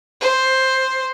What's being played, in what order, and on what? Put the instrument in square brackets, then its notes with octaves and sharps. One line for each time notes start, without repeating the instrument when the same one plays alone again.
[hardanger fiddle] C5